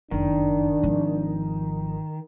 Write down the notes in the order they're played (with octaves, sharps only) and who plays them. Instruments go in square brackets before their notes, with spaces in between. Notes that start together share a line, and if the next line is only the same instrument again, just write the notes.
[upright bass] F#1 F2 [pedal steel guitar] D#3 [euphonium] D4
[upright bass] G#1 F3